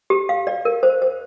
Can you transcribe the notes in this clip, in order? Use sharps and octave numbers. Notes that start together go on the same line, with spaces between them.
G4
F5
D5
A#4
C5
C5